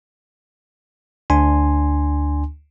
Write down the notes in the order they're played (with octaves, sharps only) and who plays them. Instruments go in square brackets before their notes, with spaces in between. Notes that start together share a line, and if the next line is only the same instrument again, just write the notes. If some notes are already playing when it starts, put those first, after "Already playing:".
[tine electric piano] D2 D4 G#5 C6